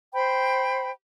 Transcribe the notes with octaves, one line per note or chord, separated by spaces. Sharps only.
C5 G5 B5